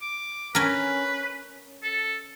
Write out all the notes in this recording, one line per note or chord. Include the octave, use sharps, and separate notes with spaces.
D6
C#4 A#4 B4
A4